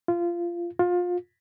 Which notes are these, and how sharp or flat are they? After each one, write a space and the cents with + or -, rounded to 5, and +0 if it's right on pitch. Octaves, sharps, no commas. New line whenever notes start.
F4 -20
F4 +25